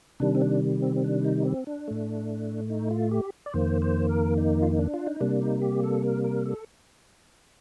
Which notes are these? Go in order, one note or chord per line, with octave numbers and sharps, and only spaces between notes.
C3 D#3 G3 D4
C4
D4
C4
C4
D4
D#4
C4
D4
A2 A3
D#4
F4
G4
D5
F2 D#3 A#3 C5
C5
A#4
D#4
F4
D#4
D4
F4
D#4
C3 G3 A#3 D4
D#4
G4
A4
A#4
A#4
A4